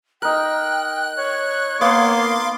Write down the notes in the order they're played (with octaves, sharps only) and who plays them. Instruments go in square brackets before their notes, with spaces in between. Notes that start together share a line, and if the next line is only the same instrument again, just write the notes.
[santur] D#4 A#4 [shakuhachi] G5 [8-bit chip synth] F#6
[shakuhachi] C#5
[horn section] A#3 [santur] B3 [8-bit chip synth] F5 C6 D6